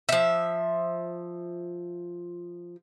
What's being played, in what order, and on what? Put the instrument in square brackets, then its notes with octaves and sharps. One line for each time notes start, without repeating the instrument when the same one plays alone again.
[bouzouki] F3 E5